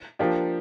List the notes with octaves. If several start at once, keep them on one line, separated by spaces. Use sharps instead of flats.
F3 A#3 D4 G4